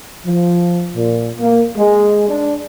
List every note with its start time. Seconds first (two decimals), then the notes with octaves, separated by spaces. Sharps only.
0.25 F3
0.95 A#2
1.39 A#3
1.76 G#3
2.29 D4